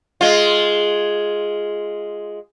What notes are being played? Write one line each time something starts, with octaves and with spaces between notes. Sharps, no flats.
G#3 F4